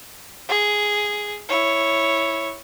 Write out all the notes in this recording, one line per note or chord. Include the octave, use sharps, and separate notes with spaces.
G#4
E4 C#5